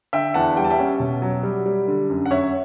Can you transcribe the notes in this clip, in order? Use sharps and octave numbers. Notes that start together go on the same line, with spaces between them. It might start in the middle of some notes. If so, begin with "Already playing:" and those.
D3 E5 G5
E2 F#5 A5
G3 G5
A5
E5 G5
C#4
B2
F#3
G3
G3
D3
F#2
F#5
F#2 C#5 E5